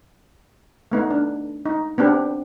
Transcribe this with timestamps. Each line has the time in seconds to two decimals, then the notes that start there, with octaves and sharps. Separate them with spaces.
0.92 A3 B3 D#4
1.11 D4
1.66 D#4
1.98 B3 C4 D4 G4